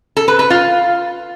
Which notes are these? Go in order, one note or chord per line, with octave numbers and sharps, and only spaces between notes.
A4
B4
B4
F4